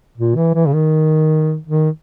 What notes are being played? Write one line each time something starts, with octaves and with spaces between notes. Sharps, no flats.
A#2
E3
E3
C#3
D#3
D#3